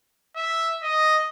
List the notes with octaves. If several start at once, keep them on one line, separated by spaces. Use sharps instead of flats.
E5
D#5